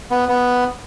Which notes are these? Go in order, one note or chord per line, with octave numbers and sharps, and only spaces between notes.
B3
B3